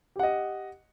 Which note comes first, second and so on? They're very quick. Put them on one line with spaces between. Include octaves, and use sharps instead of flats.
G4 F#5 D#5